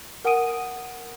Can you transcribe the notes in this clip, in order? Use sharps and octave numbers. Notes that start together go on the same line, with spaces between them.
A#4 F#5 G#5 D#6 D7 D#7